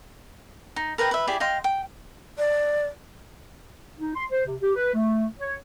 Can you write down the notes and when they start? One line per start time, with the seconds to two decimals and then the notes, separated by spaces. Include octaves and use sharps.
0.76 D#4
0.98 A#4 B4 D#5 G5
1.11 B4 E5
1.27 E4 G4 G#4 D5
1.40 D#5 F5 G5 C6
1.64 G5
2.38 D5
3.99 D#4
4.15 C6
4.31 C5
4.46 C3
4.62 G4
4.75 B4
4.94 A3
5.40 C#5